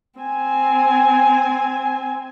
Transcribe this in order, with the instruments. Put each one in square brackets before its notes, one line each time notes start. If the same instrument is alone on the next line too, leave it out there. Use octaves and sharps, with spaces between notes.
[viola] C4 G#5